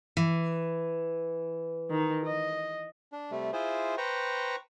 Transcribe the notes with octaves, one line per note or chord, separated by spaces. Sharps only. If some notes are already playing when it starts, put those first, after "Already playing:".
E3
D#3 D#4
D#5
D4
C3 G3 A3
E4 F4 G#4 C5
B4 C5 G5 A#5 C#6